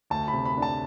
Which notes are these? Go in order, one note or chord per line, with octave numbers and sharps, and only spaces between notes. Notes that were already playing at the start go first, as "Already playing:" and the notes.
D2 A5
B5
C3
B5
D4
A5